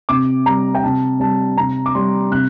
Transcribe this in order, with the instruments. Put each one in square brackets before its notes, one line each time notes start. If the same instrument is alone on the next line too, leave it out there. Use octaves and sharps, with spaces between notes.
[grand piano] C3 D6
G3 A#5
G5
C3 A5
G3 A5
C3 A#5
D6
G3 C6
C3 F#6